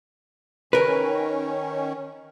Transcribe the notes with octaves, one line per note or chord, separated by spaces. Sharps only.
D#3 C#4 A#4 B4